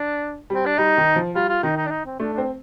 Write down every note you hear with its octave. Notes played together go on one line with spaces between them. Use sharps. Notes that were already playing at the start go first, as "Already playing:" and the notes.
Already playing: D4
G3 C4
D4
G3 D#4
D#3
F3
G3 F4
F4
D#3 D#4
D#4
D4
D#4
C4
A3 D4
C4 D4